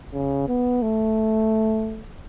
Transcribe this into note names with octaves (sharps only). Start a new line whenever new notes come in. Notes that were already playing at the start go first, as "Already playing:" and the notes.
C#3
B3
A3